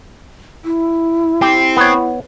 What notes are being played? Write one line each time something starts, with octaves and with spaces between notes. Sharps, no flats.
E4
C4 G4
B3 C#5